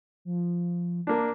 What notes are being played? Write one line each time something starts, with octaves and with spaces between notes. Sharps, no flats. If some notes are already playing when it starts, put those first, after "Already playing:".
F3
A#3 D4